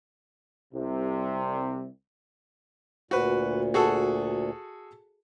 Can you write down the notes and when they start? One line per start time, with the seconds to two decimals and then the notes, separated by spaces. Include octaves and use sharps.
0.74 C2 C3
3.11 D2 A#2 F#4 B4
3.74 F#4 G#4 A4